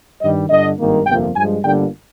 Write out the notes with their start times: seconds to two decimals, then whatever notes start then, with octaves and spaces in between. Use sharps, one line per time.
0.21 G2 D#3 G3 D#5
0.50 G1 G2 D3 D#5
0.79 G#1 G2 D#3 A#3
1.06 G1 F2 C3 F3 A#3 G5
1.35 G2 F3 G#3 G#5
1.63 G1 G2 D3 G3 A#3 G5